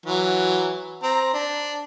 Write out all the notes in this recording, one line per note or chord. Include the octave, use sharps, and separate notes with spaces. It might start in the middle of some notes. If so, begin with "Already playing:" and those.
E3 F#3
C4 A#5
D4